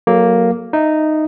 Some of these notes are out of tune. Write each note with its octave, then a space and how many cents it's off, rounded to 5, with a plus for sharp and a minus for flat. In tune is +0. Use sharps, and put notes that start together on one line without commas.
F#3 +0 A#3 +0 A4 -25
D#4 -10 E5 -15